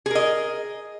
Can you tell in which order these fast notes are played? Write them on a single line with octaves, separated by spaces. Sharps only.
G#4 A#4 D#5